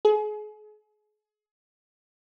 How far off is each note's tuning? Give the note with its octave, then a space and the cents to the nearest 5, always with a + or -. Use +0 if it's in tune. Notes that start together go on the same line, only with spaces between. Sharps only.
G#4 +35